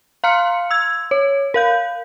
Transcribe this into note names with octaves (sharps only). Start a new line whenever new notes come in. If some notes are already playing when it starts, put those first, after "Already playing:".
F5 A#5 C6 F6 C#7
E6 G#6
C#5
A#4 F5 G6